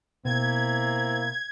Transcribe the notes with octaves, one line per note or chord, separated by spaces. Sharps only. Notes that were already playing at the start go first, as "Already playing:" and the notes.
B2 A#3 C4 E4 G#6